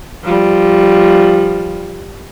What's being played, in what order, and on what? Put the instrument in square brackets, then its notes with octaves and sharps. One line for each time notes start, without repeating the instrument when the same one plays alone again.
[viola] F3 G3